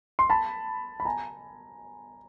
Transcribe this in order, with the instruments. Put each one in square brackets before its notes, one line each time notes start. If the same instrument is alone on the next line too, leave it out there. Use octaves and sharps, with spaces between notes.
[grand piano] C6
A5 B5
B5
G#5 A#5